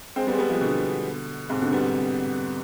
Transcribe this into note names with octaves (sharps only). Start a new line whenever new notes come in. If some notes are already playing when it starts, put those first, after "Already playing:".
G#3 C4
G3 B3
G#3
G3 B3
F3 G#3
B2 D3
G#2 C3
B2 D3
G3 B3